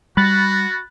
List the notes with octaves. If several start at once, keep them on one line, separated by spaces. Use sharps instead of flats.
G3 F#4 B5 F#6 A6